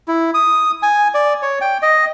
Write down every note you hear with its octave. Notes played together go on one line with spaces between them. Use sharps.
E4
D#6
G#5
D5
C#5
G5
D#5